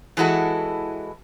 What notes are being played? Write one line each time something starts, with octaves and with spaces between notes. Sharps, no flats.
E3 G#3 E4 F#4 A4